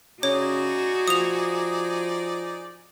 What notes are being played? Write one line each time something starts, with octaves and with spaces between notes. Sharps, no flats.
C#3 D#4 F#4 G#4 C#5 D5
F3 D#6 F7